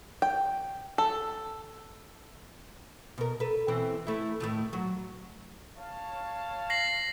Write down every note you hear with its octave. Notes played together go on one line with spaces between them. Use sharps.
G5
A4
B2 A#4
A4 B4
B2 E3 C4
A3 E4
A2 D#3 A3
F#3
C#5 F5 A5
A#6 C7 F#7